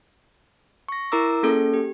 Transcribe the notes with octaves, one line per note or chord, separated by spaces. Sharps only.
C#6 A#6
E4 A#4 A#5 D6 E6
A#3 C#4 G#4 A4
G4